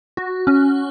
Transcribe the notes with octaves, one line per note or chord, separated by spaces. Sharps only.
F#4
C#4